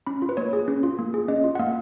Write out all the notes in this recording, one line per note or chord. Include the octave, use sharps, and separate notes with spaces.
C#4 B5
F4
B4
A#3 C#5
G#4
C#4
F4
A#3
G#4
C#4 D#5
F4
F#5
A#3 F5